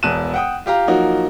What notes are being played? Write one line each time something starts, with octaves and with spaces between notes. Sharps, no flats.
E1 E2 A5 F#6 D#7 E7
F#5 G5 D#6
F4 G4 F5 A#5
F3 F#3 A#3 D#4 F#4